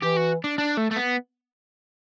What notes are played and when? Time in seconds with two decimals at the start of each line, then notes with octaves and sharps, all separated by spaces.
0.02 E3 G4
0.16 F#4
0.44 D4
0.58 D4
0.77 A3
0.91 A3
0.96 B3